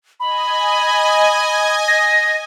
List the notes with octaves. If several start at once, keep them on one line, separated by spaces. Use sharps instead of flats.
D#5 G#5 B5
A#6